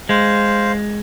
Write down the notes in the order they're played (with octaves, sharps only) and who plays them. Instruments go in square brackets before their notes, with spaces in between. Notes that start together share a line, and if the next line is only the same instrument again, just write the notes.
[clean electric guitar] G#3 [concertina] C5 F5